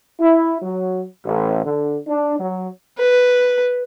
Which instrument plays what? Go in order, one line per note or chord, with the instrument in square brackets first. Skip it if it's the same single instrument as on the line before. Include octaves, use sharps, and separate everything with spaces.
[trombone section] E4
F#3
A1
D3
D4
F#3
[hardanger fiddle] B4